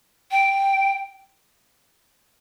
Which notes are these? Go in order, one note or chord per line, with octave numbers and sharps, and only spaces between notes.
G5